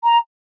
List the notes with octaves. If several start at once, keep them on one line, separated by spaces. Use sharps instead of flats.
A#5